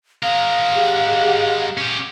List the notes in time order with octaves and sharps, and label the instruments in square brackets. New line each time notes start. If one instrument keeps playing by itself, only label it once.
[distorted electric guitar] G#3 A#4 [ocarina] F5
[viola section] G4 G#4 F#5
[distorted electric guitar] C#4 G4